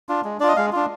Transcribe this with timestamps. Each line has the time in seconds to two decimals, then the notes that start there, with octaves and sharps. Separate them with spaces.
0.09 D4 F4
0.25 G#3
0.40 D4 F4 D5
0.48 D#5
0.56 G#3 F5
0.72 D4 F4